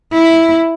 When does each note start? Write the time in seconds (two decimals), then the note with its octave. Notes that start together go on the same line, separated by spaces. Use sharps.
0.14 E4